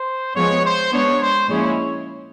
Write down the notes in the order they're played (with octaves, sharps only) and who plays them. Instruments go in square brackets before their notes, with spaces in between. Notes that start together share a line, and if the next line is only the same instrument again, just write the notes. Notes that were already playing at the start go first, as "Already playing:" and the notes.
Already playing: [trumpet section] C5
[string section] F3 G#3 B3 [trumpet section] C#5
[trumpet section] C5
[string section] G#3 B3 D4 [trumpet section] C#5
[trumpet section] C5
[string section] A#2 F3 G#3 C#4 E4 [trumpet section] C#5